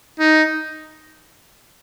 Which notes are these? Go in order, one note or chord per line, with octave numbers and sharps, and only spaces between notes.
D#4